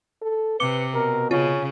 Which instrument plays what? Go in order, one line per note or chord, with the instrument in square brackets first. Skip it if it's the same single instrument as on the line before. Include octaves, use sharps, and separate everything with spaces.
[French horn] A4
[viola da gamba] C3 [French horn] B4 [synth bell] D6 C#7 G7
[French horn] B2 [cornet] A#4
[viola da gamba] C#3 [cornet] C#4 [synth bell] F4